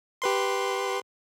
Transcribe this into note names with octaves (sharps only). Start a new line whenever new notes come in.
G4 B4 C6